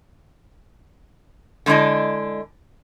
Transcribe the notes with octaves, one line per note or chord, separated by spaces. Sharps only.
D3 G#3 D4 E4 D#5